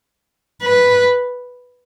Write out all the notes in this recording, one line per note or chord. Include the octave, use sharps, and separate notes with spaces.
B4